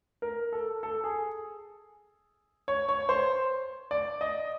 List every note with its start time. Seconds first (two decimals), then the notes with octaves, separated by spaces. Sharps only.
0.22 A#4
0.52 A4
0.83 A4
1.04 G#4
2.68 C#5
2.89 C#5
3.09 C5
3.91 D5
4.21 D#5